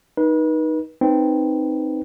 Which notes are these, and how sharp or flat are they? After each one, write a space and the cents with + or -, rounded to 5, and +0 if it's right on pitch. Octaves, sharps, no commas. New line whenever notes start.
D#4 +0 B4 -35
C4 +0 D#4 -10 B4 +0